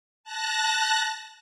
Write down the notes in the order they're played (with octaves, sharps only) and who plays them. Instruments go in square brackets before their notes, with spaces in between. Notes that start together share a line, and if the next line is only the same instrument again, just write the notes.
[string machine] A5 F#6 A#6